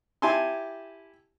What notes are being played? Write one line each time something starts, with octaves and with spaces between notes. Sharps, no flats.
E4 G4 G#5 A5 C6